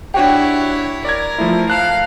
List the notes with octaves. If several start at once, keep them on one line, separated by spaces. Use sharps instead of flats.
D4 E4 F#4 G4 C#5 G5
A#4 D5 G#6
F3 A3 E4
F5 A5 F#6